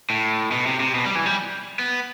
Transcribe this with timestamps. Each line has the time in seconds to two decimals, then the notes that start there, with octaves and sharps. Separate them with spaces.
0.10 A2
0.52 B2
0.66 C3
0.80 C3
0.95 B2
1.06 G3
1.15 E3
1.26 G3
1.79 B3